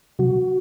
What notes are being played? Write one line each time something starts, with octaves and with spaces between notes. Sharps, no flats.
C3 F#3 F#4